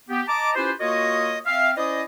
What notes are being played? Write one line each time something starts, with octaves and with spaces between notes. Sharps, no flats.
B3 G4
D#5 A5 A#5 D6
C#4 E4 F4 G4 B4 C5
A#3 F4 F#4 A#4 C#5 D#5
C4 E5 F5
C#4 E4 C5 D5 D#5